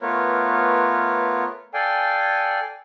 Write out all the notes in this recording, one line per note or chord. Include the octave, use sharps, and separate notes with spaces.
A3 B3 F4 A#4 B4 C#5
A4 D5 F5 G5 G#5